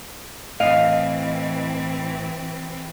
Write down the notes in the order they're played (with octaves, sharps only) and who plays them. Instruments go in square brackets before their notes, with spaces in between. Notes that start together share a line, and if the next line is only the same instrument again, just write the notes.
[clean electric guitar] A2 [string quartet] E3 C4 [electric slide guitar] D#5 [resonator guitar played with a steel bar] F5